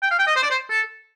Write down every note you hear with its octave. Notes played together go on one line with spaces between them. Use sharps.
G5
F5
G5
D#5
C5
D5
C5
A4